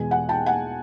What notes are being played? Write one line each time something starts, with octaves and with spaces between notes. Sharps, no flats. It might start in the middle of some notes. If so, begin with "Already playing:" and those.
Already playing: E2 B2 G#3 G#5
F#5 G#5
G5 A5
F#5 G#5